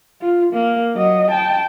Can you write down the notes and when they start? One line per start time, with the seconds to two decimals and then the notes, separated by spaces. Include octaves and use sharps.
0.21 F4
0.54 A#3
0.96 F#3 D#5
1.31 G5 A5